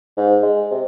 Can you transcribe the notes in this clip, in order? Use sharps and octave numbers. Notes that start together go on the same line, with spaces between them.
G#2
G#3
C3